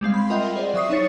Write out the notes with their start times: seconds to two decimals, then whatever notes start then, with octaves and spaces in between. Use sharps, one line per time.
0.01 G3 G#3 C4 F5
0.14 B5 C6
0.30 F4 A#4 D#5 E5 F#5 G5
0.55 G#4 C5 D5
0.74 F#3 E5 C#6 D#6 C7
0.89 D#4 E4 C#5 A6 C#7